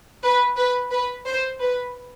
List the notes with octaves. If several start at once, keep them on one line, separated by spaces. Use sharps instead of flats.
B4
B4
B4
C5
B4